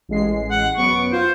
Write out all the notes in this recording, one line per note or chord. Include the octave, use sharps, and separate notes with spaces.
A1 G#3 C7
F#5
F#2 B3 C#6 D7
F4 C5